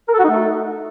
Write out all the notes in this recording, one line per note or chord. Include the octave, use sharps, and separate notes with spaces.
A#4
A4
F#4
D#4
A3